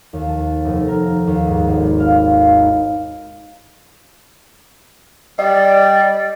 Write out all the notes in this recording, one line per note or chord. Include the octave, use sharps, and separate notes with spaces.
D#2
A5
F1
A#4
D#2
G#2
G#1
F5
D#4
G3 D5 D#5